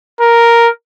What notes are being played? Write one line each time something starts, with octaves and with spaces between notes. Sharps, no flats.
A#4